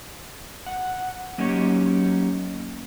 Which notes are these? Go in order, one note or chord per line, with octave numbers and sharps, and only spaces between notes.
F#5
F#3 A#3 C#4 D#4 G4 C#5